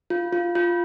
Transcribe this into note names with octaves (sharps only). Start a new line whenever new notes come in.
F4
F4
F4